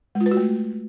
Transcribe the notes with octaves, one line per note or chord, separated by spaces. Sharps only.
G#3
F4
B4
F#4
A3